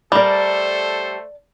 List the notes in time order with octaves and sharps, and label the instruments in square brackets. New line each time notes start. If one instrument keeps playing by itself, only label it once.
[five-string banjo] G3 A#4 [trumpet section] A3 A4 C5 [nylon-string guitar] D5 A5